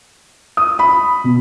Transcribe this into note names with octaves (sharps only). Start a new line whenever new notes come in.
D#6
B5
B2